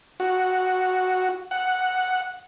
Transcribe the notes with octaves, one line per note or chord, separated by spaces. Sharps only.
F#4
F#5